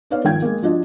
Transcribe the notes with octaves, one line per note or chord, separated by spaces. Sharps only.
B3 D#4 B4 C#5 D5 F5
G#1 F3 G5 G#6
G#3 A#3
F3 D4 F4 F#4 D#5